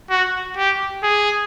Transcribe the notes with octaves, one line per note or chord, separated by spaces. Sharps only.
F#4
G4
G#4